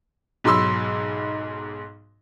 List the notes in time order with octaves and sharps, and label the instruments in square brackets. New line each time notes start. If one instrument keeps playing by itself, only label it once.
[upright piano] B1 G#2 F#3 B5 C6 E6